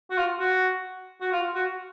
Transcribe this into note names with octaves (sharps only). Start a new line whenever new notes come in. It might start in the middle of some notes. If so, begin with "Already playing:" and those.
F#4
F4
F#4
F#4
F4
F#4